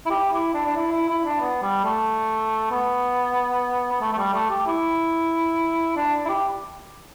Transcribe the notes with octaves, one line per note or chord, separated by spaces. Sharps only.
E4
G4
E4
D4
D4
E4
E4
E4
D4
B3
G3
A3
B3
B3
A3
A3
G3
A3
G4
E4
D4
E4
G4